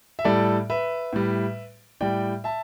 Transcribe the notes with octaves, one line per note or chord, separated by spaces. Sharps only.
E5
A2 G3 A4 D5
B4 E5
A2 G3
A2 G3 D5 G5
E5 A5